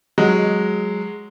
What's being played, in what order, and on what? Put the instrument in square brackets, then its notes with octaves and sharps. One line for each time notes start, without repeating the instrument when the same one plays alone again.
[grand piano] F#3 G#3